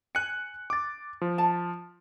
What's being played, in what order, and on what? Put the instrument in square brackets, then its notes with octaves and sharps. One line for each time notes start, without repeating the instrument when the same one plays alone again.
[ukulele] G#5 [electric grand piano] F#6 C#7
[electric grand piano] D6 A6
F3
[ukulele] A5